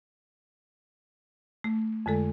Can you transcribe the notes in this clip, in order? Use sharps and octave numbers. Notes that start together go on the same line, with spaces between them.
A3
F2 D3 G#3 A4